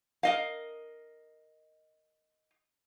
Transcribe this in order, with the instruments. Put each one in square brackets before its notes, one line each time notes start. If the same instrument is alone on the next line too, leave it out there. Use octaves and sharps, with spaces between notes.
[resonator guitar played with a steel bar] A#4 D#5 F5